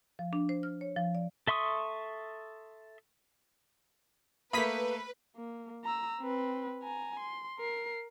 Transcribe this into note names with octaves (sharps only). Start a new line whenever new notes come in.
F3
D4
C5
F6
C#5
F3
D5
A4 E5 C6 C#6 D#6
A3 A#3 B4 B5 D#6 B6
A#3
A#5 E6
C4 B4
G#5 A#5
C6
A#4 C7